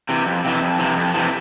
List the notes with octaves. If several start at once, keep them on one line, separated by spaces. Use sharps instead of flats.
C3 E3
F2
C3 E3
F2
C3 E3
F2
C3 E3